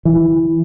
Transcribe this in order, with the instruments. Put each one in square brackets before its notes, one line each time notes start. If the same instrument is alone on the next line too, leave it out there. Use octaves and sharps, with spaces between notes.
[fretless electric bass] E3